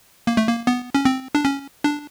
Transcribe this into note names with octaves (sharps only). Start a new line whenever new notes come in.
A#3
A3
A#3
B3
C#4
C4
D4
C#4
D4